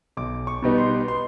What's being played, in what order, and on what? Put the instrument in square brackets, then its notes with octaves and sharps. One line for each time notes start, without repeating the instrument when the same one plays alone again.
[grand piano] B1 D6
C#6
B2 G3 B3 D#4
C6
C6